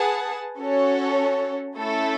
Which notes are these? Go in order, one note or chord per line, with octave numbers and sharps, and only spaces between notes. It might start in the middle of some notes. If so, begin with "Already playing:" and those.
Already playing: G#4 B4 F#5 A5
C#4 F#4 A4 C#5
A3 C#4 E4 A4